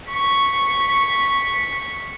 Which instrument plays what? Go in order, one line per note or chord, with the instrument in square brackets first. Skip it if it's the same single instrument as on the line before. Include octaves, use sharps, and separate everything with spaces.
[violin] C#6 B6